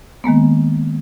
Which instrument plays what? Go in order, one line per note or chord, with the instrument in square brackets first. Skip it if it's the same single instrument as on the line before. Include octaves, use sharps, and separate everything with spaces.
[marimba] D#3 G#3 A#3 B3